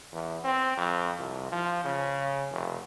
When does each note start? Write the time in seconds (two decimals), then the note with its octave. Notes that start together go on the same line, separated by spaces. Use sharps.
0.13 E2
0.44 C4
0.77 F2
1.19 C2
1.52 F3
1.85 C#3
2.51 F1